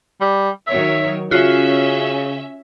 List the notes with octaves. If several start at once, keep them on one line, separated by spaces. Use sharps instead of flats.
G3
D#3 F#3 C#5 E5
C#3 C#4 F4 F#4 E5